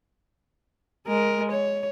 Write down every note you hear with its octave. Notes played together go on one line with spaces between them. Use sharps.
G#3 A#4
C#5